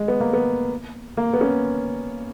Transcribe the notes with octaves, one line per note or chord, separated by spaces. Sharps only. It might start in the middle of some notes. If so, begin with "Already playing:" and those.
Already playing: G#3
B3
A#3
B3
A#3
B3
C#4